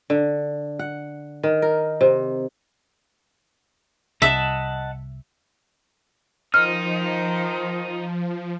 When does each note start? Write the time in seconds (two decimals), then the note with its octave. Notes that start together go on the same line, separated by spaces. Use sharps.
0.10 D3
0.79 F#5
1.43 D#3
1.62 A#4
2.01 C3
4.22 C2 D#5 E5 F#5 A5
6.54 D#3 F3 D#4 C5 F6